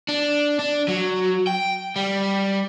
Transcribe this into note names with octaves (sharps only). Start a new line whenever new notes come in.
D4
D4
F#3
G5
G3